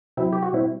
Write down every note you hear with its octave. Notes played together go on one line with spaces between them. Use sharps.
C3 F#3 C4 E4
G4
F#4
B2 G3 C4 E4